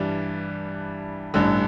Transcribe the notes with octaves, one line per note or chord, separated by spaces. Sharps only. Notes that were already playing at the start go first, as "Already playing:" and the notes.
Already playing: G2 E3 G3 D4
A1 G2 D3